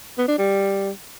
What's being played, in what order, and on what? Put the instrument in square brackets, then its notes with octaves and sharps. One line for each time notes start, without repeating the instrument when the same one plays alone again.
[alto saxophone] B3
D4
G3